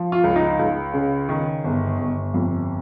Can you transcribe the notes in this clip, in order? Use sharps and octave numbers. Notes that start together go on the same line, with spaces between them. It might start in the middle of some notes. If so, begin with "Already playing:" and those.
Already playing: F3
F4
C#2
D#4
C#2
C#3
D#3
G1
G1
F2